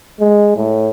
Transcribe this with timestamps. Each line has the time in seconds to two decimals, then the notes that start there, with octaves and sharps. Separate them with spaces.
0.20 G#3
0.56 A2